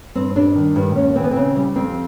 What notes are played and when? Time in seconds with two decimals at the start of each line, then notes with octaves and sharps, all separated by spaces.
0.15 G2 C4
0.36 G3 D4
0.55 D#3
0.76 G2
0.95 D#2 C#4
1.16 E3 C4
1.23 B3
1.31 C#3 C4
1.56 G3
1.75 F2 C4